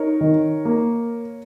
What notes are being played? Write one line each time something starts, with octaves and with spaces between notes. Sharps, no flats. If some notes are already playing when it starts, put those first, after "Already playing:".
Already playing: D#4 A#4 C#5
D#3
A#3